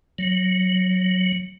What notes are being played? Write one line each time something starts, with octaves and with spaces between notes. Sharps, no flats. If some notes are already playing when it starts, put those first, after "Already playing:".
F#3